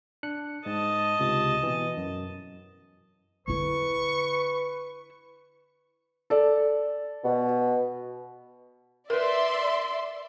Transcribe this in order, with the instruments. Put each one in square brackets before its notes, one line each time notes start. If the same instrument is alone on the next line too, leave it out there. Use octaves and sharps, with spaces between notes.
[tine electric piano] D4 F#6 C#7
[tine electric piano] G#2 [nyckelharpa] D#5 A5
[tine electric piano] C#2 C3
B2 E3
F#2
[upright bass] D3 E4 [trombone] B4 [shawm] C#6
[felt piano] A4 D5
[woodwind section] B2
[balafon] A#4 B4 [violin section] D5 E5 C6